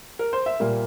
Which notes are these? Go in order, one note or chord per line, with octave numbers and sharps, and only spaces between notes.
A#4
C5
E5
A#2 G3 A#3